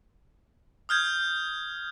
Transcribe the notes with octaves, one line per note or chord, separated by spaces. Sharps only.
D#6 F6 G6 G#6